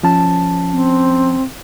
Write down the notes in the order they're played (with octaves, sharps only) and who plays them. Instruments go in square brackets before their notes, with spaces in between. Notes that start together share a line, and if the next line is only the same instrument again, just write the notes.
[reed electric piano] F3 C#4 A5
[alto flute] C4